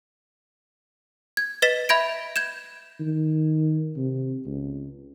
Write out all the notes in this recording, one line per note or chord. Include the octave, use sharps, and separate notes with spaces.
G#6
B4 D#5 A6 B6 E7
E5 B5 G6 G#6 A#6 D7
G6 G#6 E7
D#3
C3
C#2